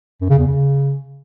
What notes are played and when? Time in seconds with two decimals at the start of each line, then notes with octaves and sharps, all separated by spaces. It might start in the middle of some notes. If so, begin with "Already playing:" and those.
0.21 F#2
0.30 C#3
0.38 E2
0.47 C#3